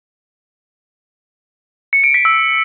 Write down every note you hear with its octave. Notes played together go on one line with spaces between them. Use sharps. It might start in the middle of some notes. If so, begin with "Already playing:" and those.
C#7
D7
B6
E6